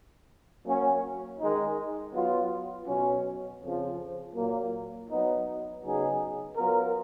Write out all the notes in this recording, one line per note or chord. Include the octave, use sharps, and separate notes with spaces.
F#3 A#3 C#4
D#3 G#3 D#4
F#3 B3 F4
B2 F#3 C#4
F2 C#3 F3
A#2 F#3 A#3
F#3 B3 D#4
C#3 F#3 B3 D#4 G#4
F#3 B3 F4 A#4